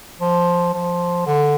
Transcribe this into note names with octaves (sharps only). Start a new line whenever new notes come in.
F3
F3
D3